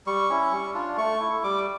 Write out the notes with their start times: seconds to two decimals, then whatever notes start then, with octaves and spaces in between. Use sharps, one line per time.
0.06 G3 C#6
0.30 C#4 E4
0.52 G3
0.74 D4 F4
0.97 A3 C#6
1.20 E4
1.43 G3 D6